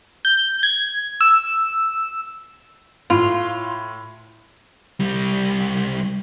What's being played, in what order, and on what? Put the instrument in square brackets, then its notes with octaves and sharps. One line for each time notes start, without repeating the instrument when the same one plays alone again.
[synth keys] G6
G#6
E6
[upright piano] A2 [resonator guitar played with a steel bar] F4
[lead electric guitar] C2 G3